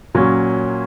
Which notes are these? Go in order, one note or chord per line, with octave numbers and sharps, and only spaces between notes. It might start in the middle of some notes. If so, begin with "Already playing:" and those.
A#2 F#3 C#4